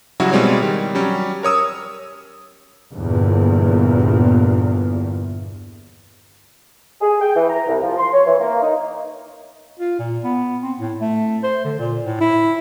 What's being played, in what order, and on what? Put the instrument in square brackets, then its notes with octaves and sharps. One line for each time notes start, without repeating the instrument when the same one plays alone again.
[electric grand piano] C#3 F#3 G3 E4 F#4
B2 G3 G#3 C4 C#5
D#3 G3
F#3 G3 C#4
A#4 C#5 D#6 E6
[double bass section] G1 E2 A#2
[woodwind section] G#4
G5
E3
A#5
C2
F3
C6
C#5
E3
A#3
D#4
[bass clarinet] F4
A#2
B3
C4
A2
A3
C5
D3
A#2
A2
E4